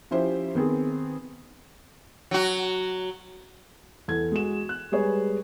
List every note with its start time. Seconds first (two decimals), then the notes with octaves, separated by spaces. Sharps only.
0.11 F3 C#4 E4 G4 C5
0.55 D#3 B3 C4 G#4
2.31 F#3 F#4
4.08 E2 A4 G#6
4.32 G#3 F#4 E7
4.69 F#6
4.92 G3 G#3 G#4 B4 C#5